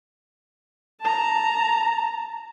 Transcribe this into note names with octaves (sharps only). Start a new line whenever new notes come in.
A5 A#5